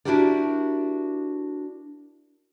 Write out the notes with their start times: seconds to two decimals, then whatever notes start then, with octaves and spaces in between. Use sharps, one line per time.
0.05 D4 E4 F#4 G4 A#4 D5